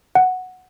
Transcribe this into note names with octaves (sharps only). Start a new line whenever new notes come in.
F#5